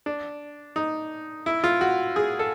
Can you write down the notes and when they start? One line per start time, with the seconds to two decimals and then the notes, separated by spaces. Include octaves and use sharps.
0.06 D4
0.76 D#4
1.46 E4
1.64 F4
1.81 F#4
2.16 G#4
2.39 A4